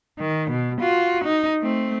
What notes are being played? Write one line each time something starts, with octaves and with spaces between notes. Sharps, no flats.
D#3
B2
F4 F#4
D#4
A3 C4